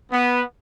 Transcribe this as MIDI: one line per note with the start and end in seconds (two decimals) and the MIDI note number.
0.12 0.42 59